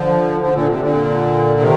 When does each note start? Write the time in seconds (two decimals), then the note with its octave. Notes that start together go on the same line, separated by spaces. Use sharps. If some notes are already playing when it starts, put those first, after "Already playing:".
Already playing: D3 F3
0.40 D3 F3
0.54 A#2 D3
0.67 C3
0.80 A#2 D3
1.60 C3 D#3